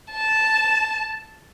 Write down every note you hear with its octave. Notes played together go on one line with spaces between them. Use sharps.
A5